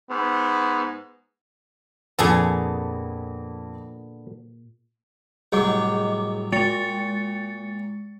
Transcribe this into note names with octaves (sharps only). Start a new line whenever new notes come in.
G#2 B3
F2 A#2 D3 B3 G#4 A4
C2 A2 F#3 G#4 D#5 D6
A#2 G#3 A6 C#7